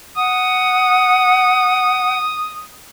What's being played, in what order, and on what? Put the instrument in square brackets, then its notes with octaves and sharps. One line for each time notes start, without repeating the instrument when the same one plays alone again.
[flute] F#5 [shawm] D#6